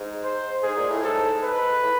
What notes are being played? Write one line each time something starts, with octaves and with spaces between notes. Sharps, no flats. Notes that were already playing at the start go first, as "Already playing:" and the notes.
Already playing: G#2
C5
G#2 G#4
A#2
A2
G#2 A4
B4
A2